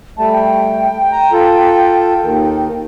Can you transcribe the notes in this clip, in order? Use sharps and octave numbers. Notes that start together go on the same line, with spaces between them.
G3 A3 A5
G5
A#5
F4 A4
D#2 D#3